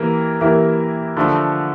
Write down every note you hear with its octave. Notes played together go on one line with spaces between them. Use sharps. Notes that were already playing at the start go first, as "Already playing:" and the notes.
Already playing: E3 A#3 G4 A#4
E3 A#3 E4 G4 A#4
D3 F3 A3